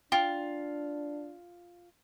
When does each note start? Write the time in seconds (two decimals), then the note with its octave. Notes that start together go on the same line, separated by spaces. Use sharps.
0.12 D4 F4 G5